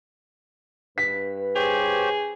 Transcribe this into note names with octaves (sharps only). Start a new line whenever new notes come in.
G2 B4 B6
G4 G#4 C5 C#5